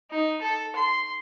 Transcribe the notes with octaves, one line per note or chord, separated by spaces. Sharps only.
D#4
A4
C6